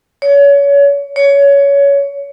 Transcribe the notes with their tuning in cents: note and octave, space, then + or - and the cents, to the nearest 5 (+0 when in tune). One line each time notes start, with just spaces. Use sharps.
C#5 +30
C#5 +20